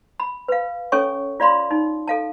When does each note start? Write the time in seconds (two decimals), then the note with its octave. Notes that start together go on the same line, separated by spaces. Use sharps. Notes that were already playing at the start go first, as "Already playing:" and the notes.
0.20 B5
0.48 B4 F5
0.92 C#4 A4 C#5 G#5 C#6
1.40 F4 D5 F5 B5 C6
1.71 D#4
2.08 A4 F5 A5